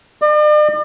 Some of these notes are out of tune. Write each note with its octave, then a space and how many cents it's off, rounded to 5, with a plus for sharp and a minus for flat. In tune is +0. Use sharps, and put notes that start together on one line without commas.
D5 +45